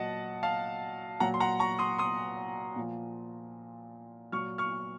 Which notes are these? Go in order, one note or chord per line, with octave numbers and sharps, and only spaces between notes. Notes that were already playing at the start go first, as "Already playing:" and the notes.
Already playing: A#2 F#3 D#5 F#5 A5
F5 A5
A#2 F#3 F#5 A#5
C6
F#5 A#5
A#5 C#6
C6 D#6
C6 D#6
A#2 F3
A#2 F#3 C#6 F6
C#6 F6